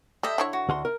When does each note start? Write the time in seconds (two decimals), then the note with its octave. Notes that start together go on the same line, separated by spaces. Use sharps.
0.23 G3 A4 D#5 E5
0.38 D3 E4 C#5
0.53 F#4
0.69 D2 F#5 C6
0.85 A#4